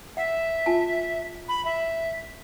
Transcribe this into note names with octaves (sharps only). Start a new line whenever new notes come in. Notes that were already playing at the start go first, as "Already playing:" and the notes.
E5 F#5
F4 G#5 A5
B5
E5